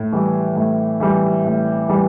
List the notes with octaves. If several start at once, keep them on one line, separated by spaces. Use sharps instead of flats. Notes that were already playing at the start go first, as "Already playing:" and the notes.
Already playing: A2
E3 G3
A2
E3 G3
A2
E3 G3